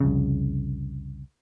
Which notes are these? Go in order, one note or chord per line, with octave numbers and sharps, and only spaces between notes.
C2 F2 C#3